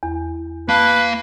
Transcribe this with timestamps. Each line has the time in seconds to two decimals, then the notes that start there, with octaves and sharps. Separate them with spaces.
0.03 E2
0.69 A#3 B4 F5 A5